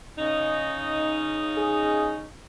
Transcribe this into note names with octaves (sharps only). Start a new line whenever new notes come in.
C#3 D#4
G#4